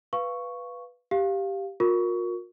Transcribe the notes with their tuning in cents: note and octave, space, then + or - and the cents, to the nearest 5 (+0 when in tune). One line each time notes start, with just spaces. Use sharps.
B4 +0 F5 -5 C#6 +0
G4 +0 F5 +0
F4 +45 A#4 +0 C#6 +20